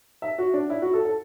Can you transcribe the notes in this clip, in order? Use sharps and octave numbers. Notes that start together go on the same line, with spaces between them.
E5
F#4
D4
E4
F#4
A4
A4